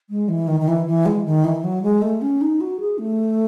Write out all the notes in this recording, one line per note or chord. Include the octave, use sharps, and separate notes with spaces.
G#3
E3
D#3
D#3
E3
E3
G#3
D#3
E3
F#3
G#3
A3
C#4
D#4
F#4
G#4
A3